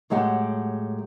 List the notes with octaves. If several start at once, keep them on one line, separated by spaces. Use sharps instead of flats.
A2 F#3 G#3 G4 F#5